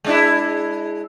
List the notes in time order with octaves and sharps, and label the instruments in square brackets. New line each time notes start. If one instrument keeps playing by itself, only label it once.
[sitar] G#3 D4 E4